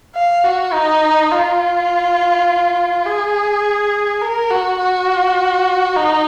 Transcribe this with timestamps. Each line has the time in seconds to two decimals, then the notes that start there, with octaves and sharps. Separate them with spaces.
0.15 F5
0.44 F#4
0.73 D#4
1.31 F4
3.06 G#4
4.22 A#4
4.51 F#4
4.80 F#4
5.97 D#4